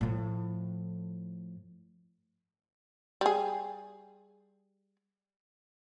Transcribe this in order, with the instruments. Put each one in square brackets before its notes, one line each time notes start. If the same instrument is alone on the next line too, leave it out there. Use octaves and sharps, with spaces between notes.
[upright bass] A2 F3
[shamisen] G3 G#4